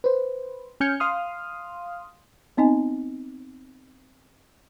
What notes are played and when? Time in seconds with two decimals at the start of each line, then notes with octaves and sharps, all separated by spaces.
0.04 B4 C5
0.80 C#4 G#5 F6 G6 G#6 C#7
1.00 F5 C6 D#6 F6
2.57 B3 C4 D#4 D#5 G#5